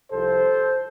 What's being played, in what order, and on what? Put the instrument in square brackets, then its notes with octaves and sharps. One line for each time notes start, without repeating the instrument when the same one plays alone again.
[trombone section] C2 C3 F3 A4 C5